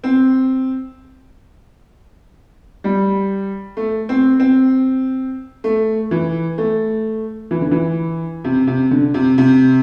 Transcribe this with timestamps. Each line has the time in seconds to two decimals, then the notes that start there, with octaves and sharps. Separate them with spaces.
0.04 C4
2.84 G3
3.77 A3
4.09 C4
4.40 C4
5.64 A3
6.11 E3
6.58 A3
7.51 E3
7.61 D3
7.71 E3
8.44 C3
8.67 C3
8.91 D3
9.14 C3
9.38 C3